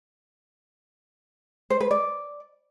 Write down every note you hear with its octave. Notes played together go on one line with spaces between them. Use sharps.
C5
B4
D5